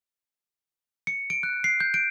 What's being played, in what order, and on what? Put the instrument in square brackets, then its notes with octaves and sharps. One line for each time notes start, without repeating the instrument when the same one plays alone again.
[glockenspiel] C#7
D7
F#6
C7
G6
D7